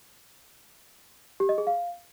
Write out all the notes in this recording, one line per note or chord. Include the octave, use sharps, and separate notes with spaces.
G4
D#5
G#4
F5